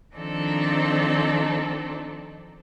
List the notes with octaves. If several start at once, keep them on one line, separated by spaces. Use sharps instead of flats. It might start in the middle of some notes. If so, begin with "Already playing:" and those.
D#3 F3 C4 D4 D#4 A4